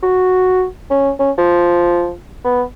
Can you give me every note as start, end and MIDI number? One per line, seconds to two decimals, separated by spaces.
0.03 0.64 66
0.90 1.11 61
1.19 1.31 61
1.38 2.12 53
2.45 2.62 59